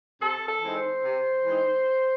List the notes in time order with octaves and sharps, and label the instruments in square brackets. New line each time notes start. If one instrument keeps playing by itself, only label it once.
[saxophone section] C3 A4
A4
E3 G#3 C4 D#4
C5
C3
E3 G#3 C4 D#4